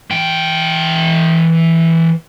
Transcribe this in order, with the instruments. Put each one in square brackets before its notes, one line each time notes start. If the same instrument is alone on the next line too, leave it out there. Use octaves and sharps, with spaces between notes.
[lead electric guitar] E3 G5